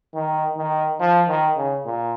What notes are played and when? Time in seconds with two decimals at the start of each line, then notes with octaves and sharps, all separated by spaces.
0.14 D#3
0.57 D#3
1.00 F3
1.29 D#3
1.57 C#3
1.85 A#2